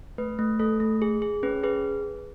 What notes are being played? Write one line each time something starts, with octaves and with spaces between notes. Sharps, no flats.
A3 B4
A3
A3 A4
A3
G#4
G#4
C#4 B4
G#4 B4